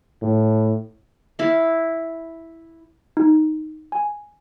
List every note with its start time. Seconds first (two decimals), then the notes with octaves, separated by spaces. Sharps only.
0.22 A2
1.39 E4 F5
3.17 D#4
3.92 G#5